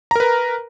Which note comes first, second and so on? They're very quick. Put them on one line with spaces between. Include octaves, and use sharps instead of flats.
A#5 A#4 B4